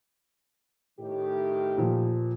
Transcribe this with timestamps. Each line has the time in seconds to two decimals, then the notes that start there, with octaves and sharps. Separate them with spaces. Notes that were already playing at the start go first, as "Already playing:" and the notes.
1.00 A2 D#3 G4
1.78 A#2 F3